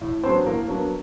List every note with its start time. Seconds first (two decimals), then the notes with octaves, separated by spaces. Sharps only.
0.01 A2
0.23 F#3 B3 C4 D4 C5
0.46 A2 A#3 A#4
0.68 F#3 B3 D4